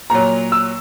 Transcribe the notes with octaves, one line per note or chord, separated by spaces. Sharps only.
A#2 F#3 A#5
E6